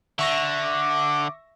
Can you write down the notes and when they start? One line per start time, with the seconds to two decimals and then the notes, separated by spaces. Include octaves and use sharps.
0.19 D3 E5 C#6 A#6
0.64 D6